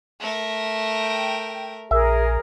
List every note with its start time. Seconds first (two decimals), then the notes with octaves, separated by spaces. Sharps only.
0.20 A3 A#4
0.95 G5
1.91 A#1 G#4 A#4 E5